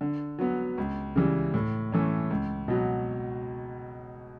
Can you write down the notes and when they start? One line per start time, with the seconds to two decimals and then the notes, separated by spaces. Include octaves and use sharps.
0.01 D3
0.39 F#3 B3
0.78 C#2
1.16 C#3 E3 G3
1.54 A2
1.92 E3 A3 C#4
2.30 C#2
2.68 B2 F#3